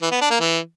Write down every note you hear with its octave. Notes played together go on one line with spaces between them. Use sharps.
E3
B3
D4
A#3
E3